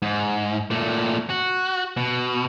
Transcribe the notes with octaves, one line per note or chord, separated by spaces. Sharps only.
G#2
A#2 A3
F#4
B2